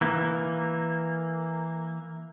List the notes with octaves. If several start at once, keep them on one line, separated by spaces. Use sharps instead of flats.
E3 A#3